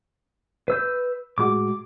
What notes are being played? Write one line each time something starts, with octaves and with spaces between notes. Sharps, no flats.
B4 E6 G6
A2 G#3 F#4 D6